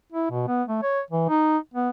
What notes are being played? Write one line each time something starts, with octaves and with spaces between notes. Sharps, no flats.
E4
B2
B3
A3
C#5
E3
D#4
B3